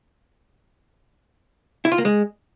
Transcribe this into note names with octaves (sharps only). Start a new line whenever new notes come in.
E4
F4
A#3
G#3